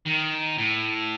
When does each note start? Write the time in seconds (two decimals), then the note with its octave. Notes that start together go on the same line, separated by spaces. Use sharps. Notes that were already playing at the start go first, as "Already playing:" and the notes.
0.06 D#3
0.58 A2